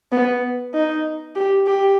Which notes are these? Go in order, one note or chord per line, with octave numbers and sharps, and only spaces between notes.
B3
D#4
G4
G4